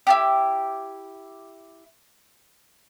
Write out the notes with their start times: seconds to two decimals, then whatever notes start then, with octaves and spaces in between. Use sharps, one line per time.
0.07 E4 F4 G4